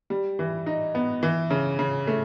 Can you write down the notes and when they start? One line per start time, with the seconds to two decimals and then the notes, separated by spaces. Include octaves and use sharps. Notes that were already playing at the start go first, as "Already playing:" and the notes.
0.10 G3
0.39 E3
0.66 D#4
0.95 B3
1.23 E3
1.51 C#3
1.79 C#3
2.07 A3